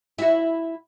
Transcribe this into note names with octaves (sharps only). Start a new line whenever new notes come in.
E4 F#4